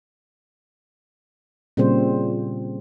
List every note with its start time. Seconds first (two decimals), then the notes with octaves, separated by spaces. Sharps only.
1.77 A#2 C#3 G3 C4 C5